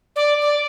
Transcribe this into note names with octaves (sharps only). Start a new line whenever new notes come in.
D5
D5